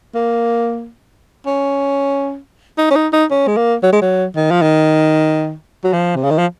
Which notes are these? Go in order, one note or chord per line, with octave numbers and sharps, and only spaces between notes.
A#3
C#4
D#4
C#4
D#4
D#4
C#4
G#3
A#3
F#3
G#3
F#3
D#3
F3
D#3
F#3
F3
C3
C#3
D#3
F3